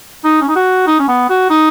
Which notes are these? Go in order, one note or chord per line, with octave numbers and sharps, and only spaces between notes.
D#4
C#4
D#4
F#4
D#4
C#4
B3
F#4
D#4